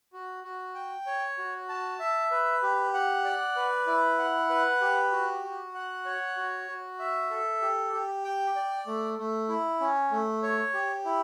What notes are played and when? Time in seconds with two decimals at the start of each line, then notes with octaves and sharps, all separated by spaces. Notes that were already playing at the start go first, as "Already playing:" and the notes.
0.13 F#4
0.44 F#4
0.75 G5
1.06 C#5
1.38 F#4
1.69 A5
2.00 E5
2.31 B4
2.63 G4
2.94 F#5
3.25 D5
3.56 B4
3.87 E4
4.19 F#5
4.50 B4
4.81 G4
5.12 F#4
5.44 F#4
5.75 F#5
6.05 C#5
6.37 F#4
6.68 F#4
6.99 E5
7.31 A4
7.62 G4
7.93 G4
8.24 G5
8.56 D5
8.87 A3
9.18 A3
9.49 E4
9.81 C#4
10.11 A3
10.43 C#5
10.74 G4
11.05 E4